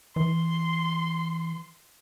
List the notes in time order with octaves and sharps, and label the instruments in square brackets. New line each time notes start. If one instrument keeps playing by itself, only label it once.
[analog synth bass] E3 [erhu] C6